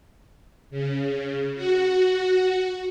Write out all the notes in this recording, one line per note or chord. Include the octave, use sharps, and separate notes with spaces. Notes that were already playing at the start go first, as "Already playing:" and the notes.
C#3
F#4